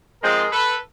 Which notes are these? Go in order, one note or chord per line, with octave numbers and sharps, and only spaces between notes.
F3 G#3 C4 F4 G#4 A#4
A4 B4